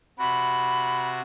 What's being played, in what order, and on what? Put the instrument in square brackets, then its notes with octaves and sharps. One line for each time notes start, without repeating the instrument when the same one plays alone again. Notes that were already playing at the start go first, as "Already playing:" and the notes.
[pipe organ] C3 F#4 [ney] B5